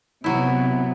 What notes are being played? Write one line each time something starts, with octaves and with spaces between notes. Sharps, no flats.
C3 F#3 B3 E4